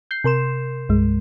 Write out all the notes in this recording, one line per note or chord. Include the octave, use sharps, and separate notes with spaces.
G6 C7
C3 A#4 C6 E7
C2 G2 G#3